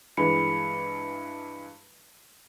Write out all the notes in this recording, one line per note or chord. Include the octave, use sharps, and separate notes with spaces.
G2 E3 G#3 B5 C#7